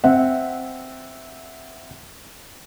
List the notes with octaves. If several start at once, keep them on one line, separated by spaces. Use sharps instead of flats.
C4 E5 F#5